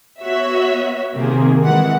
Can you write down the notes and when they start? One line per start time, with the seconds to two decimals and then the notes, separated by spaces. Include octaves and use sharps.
0.21 B3 F#4 C#5 E5
1.15 C3 D#3 A#3 C4 G#4
1.63 E3 G#3 F#5